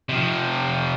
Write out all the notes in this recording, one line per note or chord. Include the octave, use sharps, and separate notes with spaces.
C3 F3